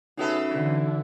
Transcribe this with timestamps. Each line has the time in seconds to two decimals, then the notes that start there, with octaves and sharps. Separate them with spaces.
0.17 C#3 B3 D#4 F#4 A4 E5
0.51 D3 E3